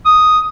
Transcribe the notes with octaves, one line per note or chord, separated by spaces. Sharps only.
D#6